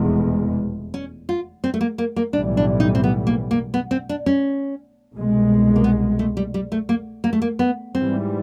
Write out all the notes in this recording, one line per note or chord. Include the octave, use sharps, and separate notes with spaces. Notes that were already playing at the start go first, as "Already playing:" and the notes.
Already playing: F1 E2 B2 G#3
C#4
F4
C4
A3
A#3
A#3
A#3
B1 A2 E3 G3 D4
D4
D#4
C4
B3
A#3
A#3
B3
C4
D4
C#4
C2 B2 G#3
A#3
B3
A3
G3
G3
A3
A#3
A#3
A3
A#3
B3
G#2 E3 G3 C4